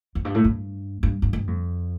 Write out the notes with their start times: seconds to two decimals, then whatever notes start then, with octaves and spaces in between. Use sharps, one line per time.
0.15 F2
0.25 G2
0.35 A2
0.44 G2
1.03 G2
1.22 G2
1.33 G2
1.47 F2